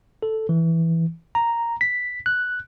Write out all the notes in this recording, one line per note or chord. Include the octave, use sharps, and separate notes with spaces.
A4
E3
A#5
B6
F#6